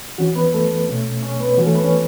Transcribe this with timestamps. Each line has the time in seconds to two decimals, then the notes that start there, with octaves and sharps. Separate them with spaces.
0.18 E3 C#4 F#4
0.36 B3 B4
0.54 A3 A4
0.88 B2 A3 C#4
1.23 C#4 C#5
1.40 B3 B4
1.58 E3 C#4 F#4
1.66 A3 A4
1.75 B3 B4
1.84 C#4 C#5